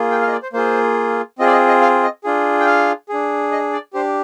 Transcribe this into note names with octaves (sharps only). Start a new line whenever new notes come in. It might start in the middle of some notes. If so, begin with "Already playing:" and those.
Already playing: A#3 F4 G#4
G5
F5
D#5
D5
C5
A#3 F4 G#4 C5
C4 F4 G#4 D#5
D5
D#5
D#5
F5
D#5
D4 F4 G#4
G5
F5
D4 G#4
D#5
D5
D4 G4 C5